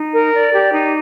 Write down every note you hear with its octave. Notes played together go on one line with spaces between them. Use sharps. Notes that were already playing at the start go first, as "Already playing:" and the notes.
Already playing: D#4
A#4
D5
G4
D#4